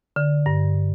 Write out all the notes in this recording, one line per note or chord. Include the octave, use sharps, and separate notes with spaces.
D3
G2